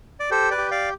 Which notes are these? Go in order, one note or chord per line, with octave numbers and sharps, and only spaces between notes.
D5
G4 A4 C5
B4 D5
G4
D5 F5